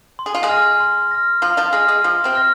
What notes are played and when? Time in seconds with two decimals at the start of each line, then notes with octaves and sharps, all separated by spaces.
0.19 C6
0.26 G#4
0.35 F4
0.43 G#3 G#4
0.49 F6 A#6
0.80 C6
1.11 F6 A#6
1.42 F3 F4 C6
1.57 F3 F4
1.72 G#3 G#4 F6 A#6
1.88 G#3 G#4
2.04 F3 F4 C6
2.24 C3 C4
2.35 F6 A#6